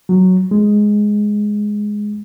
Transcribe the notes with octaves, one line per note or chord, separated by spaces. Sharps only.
F#3
G#3